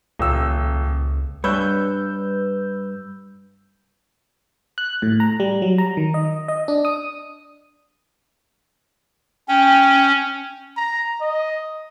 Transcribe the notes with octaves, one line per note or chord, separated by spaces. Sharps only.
D#1 C#2 E6
G2 B4 C#5 E6 G6
F#6
A2
A#5
G3
F#3
A#5
D#3
D#5
D#5
D4
D#6
C#4 G5
A#5
D#5